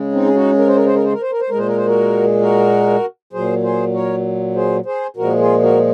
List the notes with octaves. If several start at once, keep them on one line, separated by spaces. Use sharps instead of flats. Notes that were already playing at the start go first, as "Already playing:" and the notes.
Already playing: C#3 G#3
C4 D#4
G#4
D#4 F#4
A#4
C5
A#4
C5
A#4
C5
A#4
C5
A#4
C5
A#2 G#3 A#4
C5
A#4
C5
F#4 A#4
F#4 A#4
A#2 F#3 G#4 C5
G#4 C5
A#4 C#5
G#4 C5
G#4 C5
A#2 F3 G#3 F#4 A#4
F4 G#4
F#4 A#4